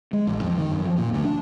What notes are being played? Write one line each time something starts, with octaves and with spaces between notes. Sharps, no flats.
G#3
A1
F2
D#3
F#2
F3
A#2
D2
D4